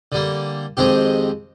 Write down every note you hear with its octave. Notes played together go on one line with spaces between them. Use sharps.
D3 G3 A#3
F2 D#3 G#3 C4 G4